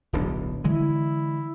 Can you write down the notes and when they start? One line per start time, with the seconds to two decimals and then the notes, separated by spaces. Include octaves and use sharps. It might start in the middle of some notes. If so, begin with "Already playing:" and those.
0.13 D1 B1 D4
0.64 D3 E3 G#3 E4